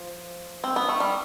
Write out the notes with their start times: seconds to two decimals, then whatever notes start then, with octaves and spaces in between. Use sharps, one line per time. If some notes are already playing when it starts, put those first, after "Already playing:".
Already playing: F3
0.64 C4
0.76 B3
0.88 A3
1.00 G3